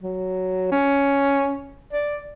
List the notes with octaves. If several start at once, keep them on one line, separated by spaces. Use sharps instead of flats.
F#3
C#4
D5